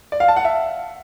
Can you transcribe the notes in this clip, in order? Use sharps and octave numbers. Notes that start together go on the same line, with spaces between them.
D5
F5
A5
F#5
E5